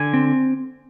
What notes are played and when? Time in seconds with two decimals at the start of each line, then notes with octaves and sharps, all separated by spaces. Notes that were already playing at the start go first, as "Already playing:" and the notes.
Already playing: D3 G#5
0.14 C4